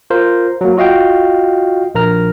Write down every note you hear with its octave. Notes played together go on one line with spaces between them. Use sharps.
F4 A#4 C5
F#3 A#3
F4 F#4 D#5 F5 G5
A#1 A#4 A#5 F6